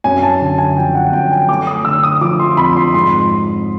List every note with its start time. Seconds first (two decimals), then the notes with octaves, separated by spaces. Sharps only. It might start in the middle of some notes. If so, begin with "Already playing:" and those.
0.04 F#2 G#5
0.23 A5
0.40 D3 A5
0.58 G#5
0.77 F3 G5
0.95 F#5
1.12 F#2 G5
1.32 G#5
1.48 A3 D6
1.67 D#6
1.85 D3 E6
2.03 D#6
2.21 F3 D6
2.40 C6
2.57 F2 B5
2.77 C6
2.94 G#2 C6